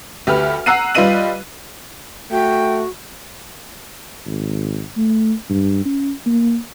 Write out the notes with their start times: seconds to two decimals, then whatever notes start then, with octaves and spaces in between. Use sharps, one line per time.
0.27 D2 G4 B4 F6
0.66 F#5 A#5 E6 F#6 C7 D#7
0.95 G3 F4 B4 D#5 D#7 F#7
2.31 A3 F#4 G5
4.26 G#1
4.97 A3
5.50 G2
5.85 C#4
6.26 A#3